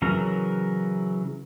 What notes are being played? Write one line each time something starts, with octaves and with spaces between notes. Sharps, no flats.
C#3 E3 F#3 A#4